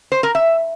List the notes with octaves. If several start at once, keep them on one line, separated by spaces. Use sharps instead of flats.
C5
A#4
E5